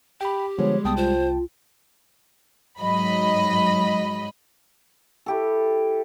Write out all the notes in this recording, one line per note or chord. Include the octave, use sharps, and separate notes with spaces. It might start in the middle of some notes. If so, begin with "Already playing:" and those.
G4 G5 B5
D3 F3 G3 G#3 B3 C#5
C2 B3 G5 A5 D#6
F4 C5
G#2 F#3 D#5 B5
E4 G4 A4